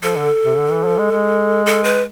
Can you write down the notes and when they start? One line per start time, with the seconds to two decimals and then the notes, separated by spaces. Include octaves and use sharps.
0.03 F3 A4
0.17 D3
0.44 C3
0.58 D3
0.71 E3
0.85 F3
0.98 G#3
1.11 G#3
1.66 A4
1.84 B4